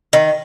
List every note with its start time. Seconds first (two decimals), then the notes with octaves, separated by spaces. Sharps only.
0.13 D#3